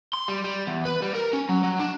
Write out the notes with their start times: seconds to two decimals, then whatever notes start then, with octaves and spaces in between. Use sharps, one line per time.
0.13 C6
0.28 G3
0.44 G3
0.67 E2
0.85 B4
1.02 G3
1.15 A#4
1.33 C#4
1.49 F#3
1.64 F#3
1.80 D4